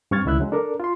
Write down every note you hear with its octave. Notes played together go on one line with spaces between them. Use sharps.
G2 C4 C#6 F6 G#6 A6
C#2 D3 E4 E5 F#6
C#3 F#3 G#3
D4 A4 A#4 D5
F4 C6